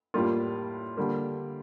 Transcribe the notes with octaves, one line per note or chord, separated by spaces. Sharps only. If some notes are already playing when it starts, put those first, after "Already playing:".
A2 G3 A#3 F4
D3 G3 A#3